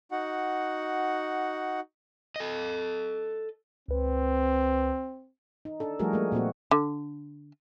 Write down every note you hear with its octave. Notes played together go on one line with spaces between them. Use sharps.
D#4 F#4 F#5
A4 D#5
C#2 C4 B4
D#4
D4 A4
F3 G3 A3 F#4 G#4 A#4
G#3 A#3
A#2 A#3 C4 F#4
D3